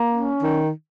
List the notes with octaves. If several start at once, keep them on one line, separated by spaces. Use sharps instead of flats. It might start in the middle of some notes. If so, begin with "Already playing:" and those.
Already playing: A#3
C#4
D#3